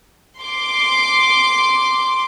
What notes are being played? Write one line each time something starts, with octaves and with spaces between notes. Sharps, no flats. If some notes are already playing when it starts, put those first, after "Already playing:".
C6 D6